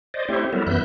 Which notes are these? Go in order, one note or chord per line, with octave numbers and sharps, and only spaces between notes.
C5 D5 D#5
A3 C4 E4 G4 C5 C#5
F#3 G3 B3 E4 A4 A#4
F#2 E3 B3 E5 F#6 G6